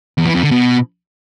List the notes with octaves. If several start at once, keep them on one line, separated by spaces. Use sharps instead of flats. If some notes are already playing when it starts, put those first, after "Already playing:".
E2
E3
F2
D3
B2